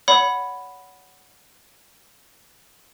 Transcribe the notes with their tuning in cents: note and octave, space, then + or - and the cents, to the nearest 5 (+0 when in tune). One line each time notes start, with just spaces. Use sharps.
C#5 +35 F#5 +0 B5 +0